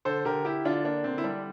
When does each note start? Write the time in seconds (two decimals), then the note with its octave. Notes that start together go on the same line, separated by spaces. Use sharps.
0.05 D3 A4 C5
0.25 D3 G4 A#4
0.45 D3 E4 G4
0.65 D3 D4 F4
0.84 A#3 D4
1.04 D3 C4
1.18 E4
1.24 G3 D4